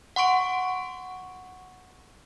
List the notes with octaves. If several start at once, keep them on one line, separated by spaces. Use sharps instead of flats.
F#5 C6 C#6 D7